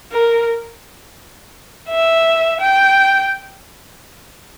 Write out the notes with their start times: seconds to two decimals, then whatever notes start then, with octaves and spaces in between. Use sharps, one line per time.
0.12 A#4
1.89 E5
2.60 G5